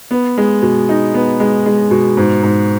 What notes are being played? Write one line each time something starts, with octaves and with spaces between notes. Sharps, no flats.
B3
G#3
B2
D#4
B3
G#3
G#3
B2
G#2
G#2